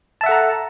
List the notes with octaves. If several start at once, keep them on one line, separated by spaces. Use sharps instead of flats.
A4 E5 F#5 A5 A#5